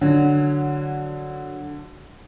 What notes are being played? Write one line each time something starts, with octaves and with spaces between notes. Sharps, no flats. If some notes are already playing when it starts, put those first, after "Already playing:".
D3 F#3